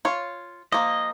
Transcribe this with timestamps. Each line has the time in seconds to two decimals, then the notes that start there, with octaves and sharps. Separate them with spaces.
0.05 F4 C#5
0.72 F3 A#3 D#5